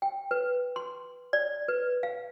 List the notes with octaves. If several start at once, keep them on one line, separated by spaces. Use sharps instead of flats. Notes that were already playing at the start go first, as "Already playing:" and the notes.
G5
B4
C6
D5
B4
F5